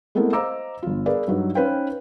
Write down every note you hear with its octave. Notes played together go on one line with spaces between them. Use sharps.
G#3 A3 B3 C4 E4 A#4
C5 D#5 F5 A#5 D6 E6
G1 F4
G#4 A#4 B4 D5 F5
G2 F#3 D#4
C#4 D#4 B4 C5 F5 G5